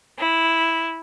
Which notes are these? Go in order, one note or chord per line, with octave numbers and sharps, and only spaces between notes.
E4